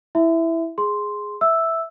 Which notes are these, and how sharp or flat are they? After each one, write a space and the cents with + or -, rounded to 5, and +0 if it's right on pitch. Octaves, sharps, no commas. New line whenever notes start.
E4 +0 E5 +0 C6 -45
G#4 +0 C6 +0
E5 -5 E6 +0